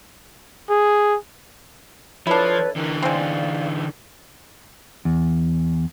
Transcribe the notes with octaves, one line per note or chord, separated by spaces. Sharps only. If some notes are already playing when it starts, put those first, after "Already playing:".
G#4
F3 D4 E4 A4 B4 C#5
D3 E3 A#4
G#3 C4 D5 F5
E2